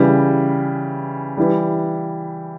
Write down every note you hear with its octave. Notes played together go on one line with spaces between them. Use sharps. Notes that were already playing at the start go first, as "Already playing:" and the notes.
Already playing: C#3 E3 G3
E3 G3